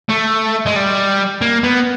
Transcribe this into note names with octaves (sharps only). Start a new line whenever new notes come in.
A3
G#3
G3
A#3
B3